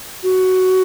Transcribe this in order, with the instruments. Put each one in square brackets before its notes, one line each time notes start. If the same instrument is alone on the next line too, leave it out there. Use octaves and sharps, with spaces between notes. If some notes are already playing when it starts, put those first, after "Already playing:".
[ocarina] F#4